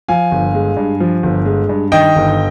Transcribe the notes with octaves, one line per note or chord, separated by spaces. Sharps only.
F3 F5 G#5
G1
G#3
G2
F3
G1
G#3
G2
D#3 D#5 G5
G1